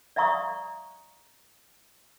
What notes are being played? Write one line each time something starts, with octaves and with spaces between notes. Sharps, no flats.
D5 E5 F5 A#5 C#6 D#6